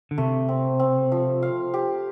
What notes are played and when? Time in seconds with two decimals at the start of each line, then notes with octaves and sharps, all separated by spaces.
0.11 D3
0.18 C3 A3
0.49 C4
0.79 C4
1.12 F3
1.43 F5
1.74 G4